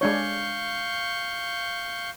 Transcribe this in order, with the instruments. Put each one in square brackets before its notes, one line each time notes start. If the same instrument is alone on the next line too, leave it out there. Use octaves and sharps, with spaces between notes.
[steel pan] G#3 D4 C#5 [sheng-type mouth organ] F5 C#6 G6